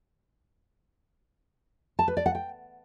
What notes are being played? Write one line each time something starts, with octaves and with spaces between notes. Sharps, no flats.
A5
B4
D5
F#5
G5